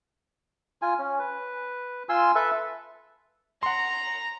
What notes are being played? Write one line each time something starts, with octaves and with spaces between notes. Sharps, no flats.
F4 G#5
C#4
B4
F4 G#5 C6 E6
A4 B4 E5
F#5 A#5 C6